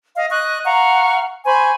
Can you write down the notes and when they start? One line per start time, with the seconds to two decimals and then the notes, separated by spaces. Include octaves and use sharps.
0.15 D#5 F5
0.30 D#5 C#6 F#6
0.65 F5 F#5 A#5 C#6
1.45 C5 G#5 B5 C#6